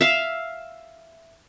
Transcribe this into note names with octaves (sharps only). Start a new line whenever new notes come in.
E5 F5